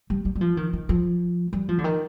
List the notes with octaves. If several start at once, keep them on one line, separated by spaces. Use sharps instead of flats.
G3
G3
G3
F3
D#3
D#3
F3
G3
F3
D3
D#3